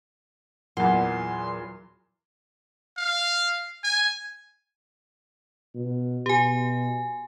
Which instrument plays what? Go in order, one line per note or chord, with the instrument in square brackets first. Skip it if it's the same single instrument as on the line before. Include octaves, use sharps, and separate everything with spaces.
[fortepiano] E2 A#2 [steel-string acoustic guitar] F#3 [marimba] F#5 [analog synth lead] C6
[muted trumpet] F5
G#5
[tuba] B2
[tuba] B2 [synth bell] G4 G#5